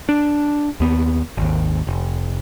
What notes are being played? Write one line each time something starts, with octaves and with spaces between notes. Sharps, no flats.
D4
D#2 B3
G#1 D#2
F1